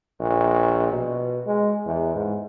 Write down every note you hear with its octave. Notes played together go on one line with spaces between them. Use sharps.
A#1
B2
G#3
E2
G#2